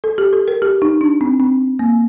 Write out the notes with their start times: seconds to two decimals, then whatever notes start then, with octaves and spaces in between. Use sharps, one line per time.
0.04 A4
0.18 G4
0.33 A4
0.48 A#4
0.62 G4
0.82 D#4
1.01 D4
1.21 C4
1.40 C4
1.79 A#3